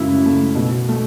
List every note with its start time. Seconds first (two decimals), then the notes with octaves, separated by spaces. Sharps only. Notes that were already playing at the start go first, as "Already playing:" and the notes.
Already playing: F#2 C#3 A3 E4
0.22 C#3 A3
0.55 B2
0.89 A3